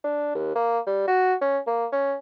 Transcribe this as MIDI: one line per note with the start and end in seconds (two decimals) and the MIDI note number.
0.04 0.34 62
0.35 0.52 39
0.55 0.79 58
0.86 1.05 55
1.07 1.34 66
1.41 1.59 61
1.67 1.87 58
1.93 2.15 61